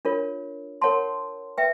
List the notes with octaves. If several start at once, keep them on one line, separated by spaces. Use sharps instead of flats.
D4 F4 A#4 C#5
A#4 C#5 F#5 A5 C6
B4 E5 G5